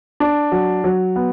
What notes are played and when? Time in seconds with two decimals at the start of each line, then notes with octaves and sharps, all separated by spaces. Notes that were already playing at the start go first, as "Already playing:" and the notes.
0.20 D4
0.52 F#3
0.84 F#3
1.16 B3